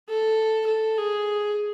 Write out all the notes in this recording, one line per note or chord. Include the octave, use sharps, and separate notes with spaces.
A4
A4
G#4